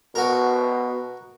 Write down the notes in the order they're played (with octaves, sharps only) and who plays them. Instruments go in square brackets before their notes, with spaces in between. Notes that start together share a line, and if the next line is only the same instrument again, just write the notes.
[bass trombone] B2 [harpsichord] F#4 A#4